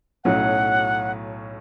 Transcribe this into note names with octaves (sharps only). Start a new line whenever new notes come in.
B1 A2 F#3 C#4 F#5